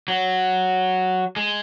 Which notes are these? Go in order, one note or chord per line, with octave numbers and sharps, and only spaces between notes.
F#3
G#3